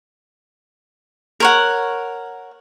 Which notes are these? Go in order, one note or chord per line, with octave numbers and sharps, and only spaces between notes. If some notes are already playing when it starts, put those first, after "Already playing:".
A#4 C#5 F#5